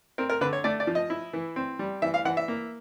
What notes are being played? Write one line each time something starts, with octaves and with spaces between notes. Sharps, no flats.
C4 A#4
A#4
D3 B4
C#5
A3 D5
D5
F3
D#5
E4
E3
C4
G3
E3 E5
F5
E3 F#5
E5
A#3